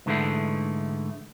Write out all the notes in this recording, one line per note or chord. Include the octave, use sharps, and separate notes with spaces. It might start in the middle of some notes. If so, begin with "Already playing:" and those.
G#2 D3 E3 F3 G#3 A3